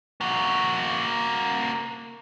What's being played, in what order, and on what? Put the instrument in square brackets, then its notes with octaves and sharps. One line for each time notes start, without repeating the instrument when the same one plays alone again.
[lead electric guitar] A#3 F#4